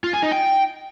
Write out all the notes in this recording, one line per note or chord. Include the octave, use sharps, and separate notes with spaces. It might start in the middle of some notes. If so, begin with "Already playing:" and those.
F4
G#4
D#4
G5